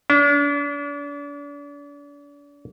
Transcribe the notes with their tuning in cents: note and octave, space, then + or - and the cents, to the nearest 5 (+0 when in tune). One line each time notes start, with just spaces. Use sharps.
D4 -40